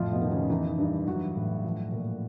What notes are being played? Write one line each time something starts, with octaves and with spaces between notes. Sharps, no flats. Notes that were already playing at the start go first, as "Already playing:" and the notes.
Already playing: F2 A2 F3 F4
B2 B3
D#3
C#3 C#4
D#3 E3 D#4
G2
E3 F#3 F#4
A2
F3
A#2